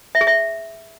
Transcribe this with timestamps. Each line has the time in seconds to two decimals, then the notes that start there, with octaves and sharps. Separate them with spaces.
0.15 E5
0.21 G#4
0.27 E5